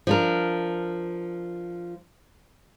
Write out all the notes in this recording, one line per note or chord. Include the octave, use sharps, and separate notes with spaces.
F3 D4 A#4